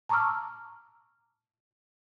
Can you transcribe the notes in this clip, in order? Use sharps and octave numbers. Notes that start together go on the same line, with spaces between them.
A5 A#5 C#6 D6 E6 F6